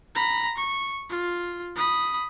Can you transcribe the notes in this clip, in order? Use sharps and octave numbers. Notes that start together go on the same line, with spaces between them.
A#5 B5
C#6
F4
B5 D#6